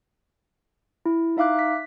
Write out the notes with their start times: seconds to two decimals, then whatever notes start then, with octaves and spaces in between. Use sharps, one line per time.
1.06 E4
1.37 D#4 E5 F5 D6 F#6
1.59 B6